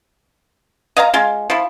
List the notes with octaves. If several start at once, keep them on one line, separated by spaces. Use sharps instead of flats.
D#5 F5 G#5 A#5
G#3 F4
F3 E4